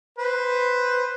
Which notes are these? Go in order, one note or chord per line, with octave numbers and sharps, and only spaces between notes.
B4 C5